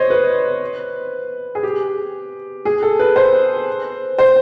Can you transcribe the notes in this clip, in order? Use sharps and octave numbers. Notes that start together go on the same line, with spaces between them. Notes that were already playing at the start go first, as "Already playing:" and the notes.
Already playing: C5 C#5 D#5
B4
G#4
G4
G#4
A4
B4
C5
C5